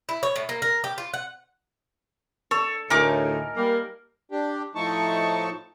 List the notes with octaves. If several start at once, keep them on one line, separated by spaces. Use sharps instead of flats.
E4
C#5
A2
A#3
A#4
G4
F4
F#5
A4 C#5
D2 A2 D#4 A#4 G#5 D6
G3 A#3
D4 G4
A2 F3 A3 D#4 A5 C#6